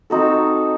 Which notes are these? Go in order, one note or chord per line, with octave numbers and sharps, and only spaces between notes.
C4 D#4 F#4 A4